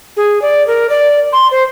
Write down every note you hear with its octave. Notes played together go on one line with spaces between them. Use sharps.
G#4
D5
A#4
D5
C6
C5